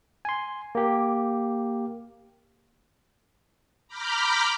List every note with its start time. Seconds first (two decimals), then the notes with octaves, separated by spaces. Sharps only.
0.25 G#5 C6
0.75 A#3 G4
3.88 A#5 B5 D6 F6 G6